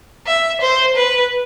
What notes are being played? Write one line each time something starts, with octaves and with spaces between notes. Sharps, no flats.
E5
C5
B4